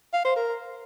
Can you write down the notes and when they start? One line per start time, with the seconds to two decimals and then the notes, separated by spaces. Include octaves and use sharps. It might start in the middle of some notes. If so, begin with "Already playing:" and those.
0.14 F5
0.25 C5
0.36 A#4